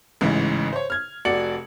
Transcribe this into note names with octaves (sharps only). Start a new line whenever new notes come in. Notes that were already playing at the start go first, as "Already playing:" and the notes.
A1 G#2 C#3 E3
C5 C#5
F6 G#6
F1 F#4 D5 C#7 F#7